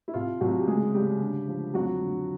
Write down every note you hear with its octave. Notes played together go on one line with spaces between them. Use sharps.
E4
C2 F4
C2 F#3 F#4
G4
C#3 G#3 G#4
C#3 G3 G4
D3
F3
F2 F#3 F#4
D3